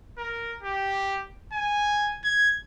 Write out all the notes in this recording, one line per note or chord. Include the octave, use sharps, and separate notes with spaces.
A#4
G4
G#5
G#6